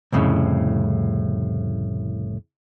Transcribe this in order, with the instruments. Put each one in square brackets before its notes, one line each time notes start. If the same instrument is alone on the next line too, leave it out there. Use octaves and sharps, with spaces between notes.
[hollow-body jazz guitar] C2 F2 A2 C#3